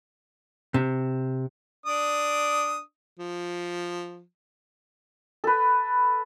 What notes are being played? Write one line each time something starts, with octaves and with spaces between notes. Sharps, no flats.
C3
D4 D5 D#6
F3
A4 B4